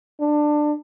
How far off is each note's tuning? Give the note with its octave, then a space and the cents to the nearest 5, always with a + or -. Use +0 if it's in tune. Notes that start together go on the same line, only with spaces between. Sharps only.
D4 +20